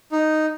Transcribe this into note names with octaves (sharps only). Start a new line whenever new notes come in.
D#4